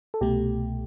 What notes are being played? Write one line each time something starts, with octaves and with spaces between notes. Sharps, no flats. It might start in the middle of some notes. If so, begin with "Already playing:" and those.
A4
C2 B2 A3 G4